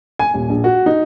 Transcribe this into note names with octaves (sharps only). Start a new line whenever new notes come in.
G#5
D#1
A#1
F#4
D#4